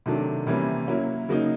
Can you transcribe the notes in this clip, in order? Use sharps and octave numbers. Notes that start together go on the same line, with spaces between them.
C3 D#3 F#3 A3 D4
C3 E3 G3 A#3 C#4
F#3 A#3 C#4 E4
C#3 F#3 A#3 D#4